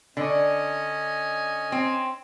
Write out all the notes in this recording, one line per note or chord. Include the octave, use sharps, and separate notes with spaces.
D3 C#4 D#5
C4